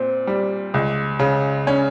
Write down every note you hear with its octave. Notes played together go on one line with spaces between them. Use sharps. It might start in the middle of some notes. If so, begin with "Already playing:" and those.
Already playing: A#2 C4
G3
C#2
C#3
C#4